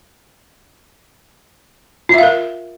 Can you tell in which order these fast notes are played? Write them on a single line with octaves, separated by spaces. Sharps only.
F4 E5 F5 A#4